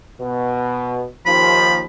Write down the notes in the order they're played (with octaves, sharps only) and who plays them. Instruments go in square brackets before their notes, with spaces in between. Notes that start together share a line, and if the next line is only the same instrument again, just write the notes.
[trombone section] B2
[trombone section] D#2 F3 [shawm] B5